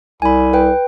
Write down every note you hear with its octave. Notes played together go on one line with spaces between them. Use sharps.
C2 G#5 B5
B4 G5